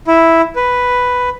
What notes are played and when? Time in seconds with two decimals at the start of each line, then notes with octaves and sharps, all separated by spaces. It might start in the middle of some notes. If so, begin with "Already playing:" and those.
0.07 E4
0.56 B4